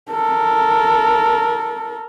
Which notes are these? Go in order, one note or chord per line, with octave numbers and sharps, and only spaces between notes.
A4 A#4